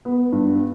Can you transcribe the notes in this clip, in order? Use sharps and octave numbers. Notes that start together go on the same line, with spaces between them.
B3
G2